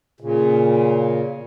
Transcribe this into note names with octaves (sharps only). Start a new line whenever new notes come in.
A#2 C#3